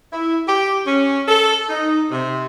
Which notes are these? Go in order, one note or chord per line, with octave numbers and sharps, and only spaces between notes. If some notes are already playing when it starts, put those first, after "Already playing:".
E4
G4
C#4
A4
D#4
C3